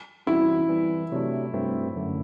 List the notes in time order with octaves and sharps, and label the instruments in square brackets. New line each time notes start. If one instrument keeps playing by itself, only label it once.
[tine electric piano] E3 G3 C4 F#4 [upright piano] E4
[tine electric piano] E3 G3 C4
C3 F#3 A3 D4
G2 F#3 A3 C4
F#2 D3 A3